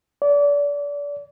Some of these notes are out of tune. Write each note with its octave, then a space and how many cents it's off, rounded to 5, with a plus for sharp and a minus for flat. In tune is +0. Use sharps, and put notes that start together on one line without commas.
D5 -30